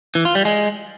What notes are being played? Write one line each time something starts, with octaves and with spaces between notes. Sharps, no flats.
E3
F4
G3
G#3